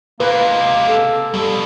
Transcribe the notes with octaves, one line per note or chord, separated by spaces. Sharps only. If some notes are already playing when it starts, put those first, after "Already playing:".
C3 G#3 A#3 B4
A4
F2 B2 G3